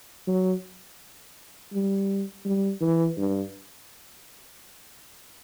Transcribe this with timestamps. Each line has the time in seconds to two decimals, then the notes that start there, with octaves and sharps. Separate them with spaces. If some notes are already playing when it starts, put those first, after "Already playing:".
0.27 F#3
1.73 G3
2.45 G3
2.81 E3
3.17 G2